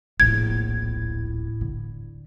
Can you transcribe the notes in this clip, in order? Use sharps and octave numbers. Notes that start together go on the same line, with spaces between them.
D1 A#1 A2 G#6
D3